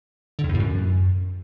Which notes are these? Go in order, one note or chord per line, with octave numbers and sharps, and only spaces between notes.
D3
F2
E2
A2
F#2